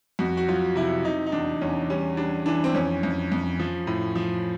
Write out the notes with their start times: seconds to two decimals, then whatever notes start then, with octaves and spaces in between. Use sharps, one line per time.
0.19 F2 F#4
0.37 F#4
0.48 F#3 F4
0.76 C3 E4
1.05 C3 D#4
1.26 D#4
1.32 E2 D4
1.61 E2 C#4
1.90 G3 C#4
2.17 G3 D4
2.46 E3 D4
2.64 C4
2.74 F2 C#4
3.03 F2
3.32 F2
3.60 F3
3.87 A2
4.16 F3